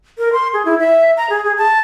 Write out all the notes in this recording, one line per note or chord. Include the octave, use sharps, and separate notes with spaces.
A#4
C6
G#4
E4
E5
A#5
G#4
G#4
A5